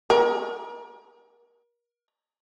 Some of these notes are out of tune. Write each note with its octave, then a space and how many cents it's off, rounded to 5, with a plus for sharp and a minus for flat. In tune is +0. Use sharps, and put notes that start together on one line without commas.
A#4 +35